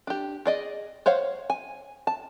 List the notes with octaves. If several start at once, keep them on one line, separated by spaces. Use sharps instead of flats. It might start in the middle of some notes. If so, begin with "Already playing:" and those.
D4 G4
G#4 D5 D#5
C5 C#5 F5 F#5
G#5
A5